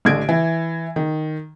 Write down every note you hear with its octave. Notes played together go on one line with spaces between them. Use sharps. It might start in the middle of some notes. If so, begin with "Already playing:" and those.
A1 D3 G#6 D7
E3
D#3